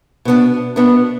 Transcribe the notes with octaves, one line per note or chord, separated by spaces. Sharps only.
B2 B3 D4
B2 B3 D4